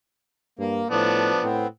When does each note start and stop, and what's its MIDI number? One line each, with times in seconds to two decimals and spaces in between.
0.59 0.82 43
0.59 0.88 58
0.90 1.31 45
0.90 1.43 53
0.90 1.43 59
0.90 1.43 62
1.43 1.66 45
1.43 1.67 59
1.43 1.67 60